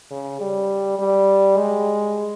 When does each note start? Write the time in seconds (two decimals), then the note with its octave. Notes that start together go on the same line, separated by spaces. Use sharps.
0.11 C#3
0.41 G3
0.99 G3
1.58 G#3